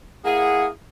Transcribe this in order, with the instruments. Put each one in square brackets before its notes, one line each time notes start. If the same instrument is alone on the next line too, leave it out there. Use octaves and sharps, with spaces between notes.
[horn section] A#3 E4 G#4 [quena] F#5